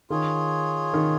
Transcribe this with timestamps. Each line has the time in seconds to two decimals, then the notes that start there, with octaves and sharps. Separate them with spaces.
0.10 D#3 F4 G#4 C#5
0.94 D#3